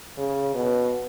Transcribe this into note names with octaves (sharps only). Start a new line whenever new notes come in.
C#3
B2